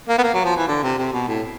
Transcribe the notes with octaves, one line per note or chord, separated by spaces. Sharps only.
A#3
B3
A#3
F#3
F3
E3
D3
C3
C3
B2
A2